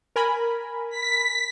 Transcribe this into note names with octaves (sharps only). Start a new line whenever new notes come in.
A#4 G#5 B5
B6